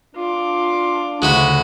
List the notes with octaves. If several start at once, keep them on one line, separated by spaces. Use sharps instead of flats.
D4 F4 D6
D2 C#3 G#3 A3 F#4 B5